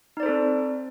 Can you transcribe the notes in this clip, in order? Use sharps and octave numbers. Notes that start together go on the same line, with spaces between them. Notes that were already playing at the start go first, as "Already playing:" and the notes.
C4 D#4 A4 C5 D5